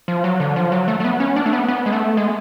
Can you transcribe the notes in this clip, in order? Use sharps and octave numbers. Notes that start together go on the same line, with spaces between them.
F3
F#3
D3
F3
F#3
A3
A3
B3
C#4
D4
A3
B3
B3
G#3
A3
G#3